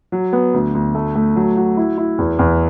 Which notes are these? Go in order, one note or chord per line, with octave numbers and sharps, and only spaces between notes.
F#3
B3
D2
D2
A3
A3
F#3
F#4
E4
E4
E2
E2